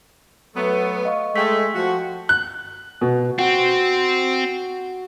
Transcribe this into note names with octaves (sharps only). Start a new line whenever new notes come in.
F#3 A3 B3
D#5 F5 C#6
G#3 A3 G5 B6
F3 F#4
F#6
B2
C4 F#4